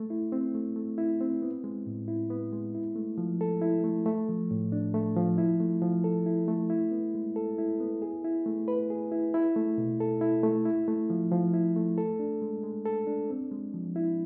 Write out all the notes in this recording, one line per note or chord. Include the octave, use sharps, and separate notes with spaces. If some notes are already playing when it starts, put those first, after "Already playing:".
Already playing: A3
E4
C4
A3
A3
E4
C4
B3
G#3
A2
E4
B3
G#3
E4
A3
F3
A4
E4
A3
A3
F3
A2
D4
A3
F3
E4
A3
F3
A4
E4
A3
E4
B3
G#3
A4
E4
B3
G#4
E4
A3
B4
G#4
E4
E4
A3
B2
A4
E4
A3
E4
A3
F3
F3
E4
A3
A4
D4
G#3
G#3
A4
D4
C4
G#3
F3
E4